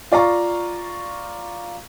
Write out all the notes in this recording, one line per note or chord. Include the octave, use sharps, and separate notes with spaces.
F4 D5 F5 A#5 C#6